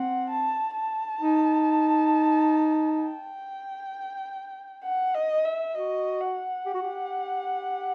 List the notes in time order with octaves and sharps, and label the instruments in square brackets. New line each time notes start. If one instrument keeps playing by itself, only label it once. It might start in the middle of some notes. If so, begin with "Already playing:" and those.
Already playing: [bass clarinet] C4 [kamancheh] F#5
[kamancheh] A5
A5
[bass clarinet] D#4
[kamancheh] G5
F#5
D#5
E5
[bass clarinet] F#4 [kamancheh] D#5
[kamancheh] F#5
[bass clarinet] G4
F#4
G4